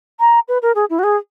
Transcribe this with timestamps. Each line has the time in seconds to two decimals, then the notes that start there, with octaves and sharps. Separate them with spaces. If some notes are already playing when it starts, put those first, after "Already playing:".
0.20 A#5
0.48 B4
0.62 A#4
0.75 G#4
0.90 E4
0.99 F#4
1.03 G#4